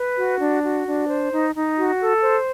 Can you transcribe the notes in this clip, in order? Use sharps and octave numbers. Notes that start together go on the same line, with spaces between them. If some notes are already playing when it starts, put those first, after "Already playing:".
Already playing: B4
F#4
D4
F#4
D4
C5
D#4
D#4
F#4
A4
C5